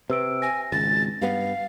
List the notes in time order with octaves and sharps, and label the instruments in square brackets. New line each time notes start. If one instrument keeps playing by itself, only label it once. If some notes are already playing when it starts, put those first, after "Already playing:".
[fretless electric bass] C3 [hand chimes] B4 E6 D7
[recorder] G#5 [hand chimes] A#6
[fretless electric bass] G#1 C#2 [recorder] A6
[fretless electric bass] G2 G3 B3 [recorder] F5